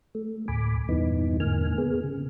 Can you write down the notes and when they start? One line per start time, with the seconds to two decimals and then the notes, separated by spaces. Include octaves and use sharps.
0.15 A3
0.48 D2 A2 G#5 B5 D6
0.89 E2 G2 A#2 E3 B3 D#4
1.40 E2 G#2 D3 A#3 G#5 F6
1.78 B3 G#4
2.04 C#3